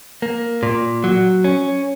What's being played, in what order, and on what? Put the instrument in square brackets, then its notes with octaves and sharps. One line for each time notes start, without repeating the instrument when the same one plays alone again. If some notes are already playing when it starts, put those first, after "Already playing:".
[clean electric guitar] A#3
A#2
F#3
C#4